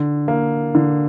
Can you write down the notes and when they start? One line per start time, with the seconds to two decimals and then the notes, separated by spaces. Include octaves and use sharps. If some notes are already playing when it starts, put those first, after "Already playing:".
Already playing: D3
0.28 A#3
0.75 D3